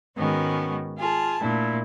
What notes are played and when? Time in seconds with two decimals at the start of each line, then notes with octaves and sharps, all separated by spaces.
0.17 G#2 D#3 G#3 B3 C#4 F#4
0.98 F4 G#4 A5
1.41 A#2 A3 D4 E4